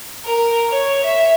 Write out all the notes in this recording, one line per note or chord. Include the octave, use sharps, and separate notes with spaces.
A#4
C#5
E5